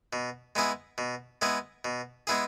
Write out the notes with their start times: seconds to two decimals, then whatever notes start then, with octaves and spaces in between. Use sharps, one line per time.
0.13 B2
0.55 G#3 B3 E4 G#4
0.98 B2
1.42 G#3 B3 E4 G#4
1.85 B2
2.27 G#3 B3 E4 G#4